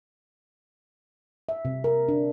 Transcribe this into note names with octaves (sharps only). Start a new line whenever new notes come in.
E5
C3
A#4
D4